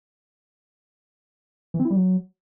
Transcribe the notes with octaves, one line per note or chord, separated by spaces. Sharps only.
E3
C4
E4
G3
F#3